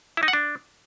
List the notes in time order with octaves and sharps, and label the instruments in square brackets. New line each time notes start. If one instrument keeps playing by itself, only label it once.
[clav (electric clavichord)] E4
D#4
F#5
D4